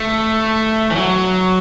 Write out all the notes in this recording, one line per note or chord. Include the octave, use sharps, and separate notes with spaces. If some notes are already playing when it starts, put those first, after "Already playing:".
Already playing: A3
E3
F#3